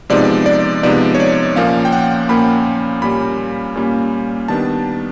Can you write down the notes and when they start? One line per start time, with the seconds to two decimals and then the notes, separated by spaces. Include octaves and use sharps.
0.10 C3 F3 G#3 B3 D#4 D5
0.46 D5
0.83 C3 F3 G#3 B3 D#4 D5
1.14 C#5
1.20 D5
1.55 A#2 F3 A#3 C#4 F5
1.85 G5
1.92 F#5
2.29 A#2 F3 A#3 C#4 B5
3.02 A#2 G3 A#3 C#4 B5
3.75 A#2 G3 A#3 C#4
4.48 D#3 G3 B3 D4 A5